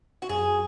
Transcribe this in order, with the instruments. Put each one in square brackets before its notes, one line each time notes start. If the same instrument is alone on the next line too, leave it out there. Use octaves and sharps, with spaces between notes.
[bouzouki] F#4
[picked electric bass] F#2 [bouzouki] G#4